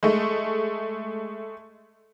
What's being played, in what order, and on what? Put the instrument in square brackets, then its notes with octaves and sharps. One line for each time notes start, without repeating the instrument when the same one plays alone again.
[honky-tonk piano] G#3 A3